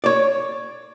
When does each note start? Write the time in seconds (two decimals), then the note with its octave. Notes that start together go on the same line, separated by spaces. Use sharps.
0.04 C#5 D5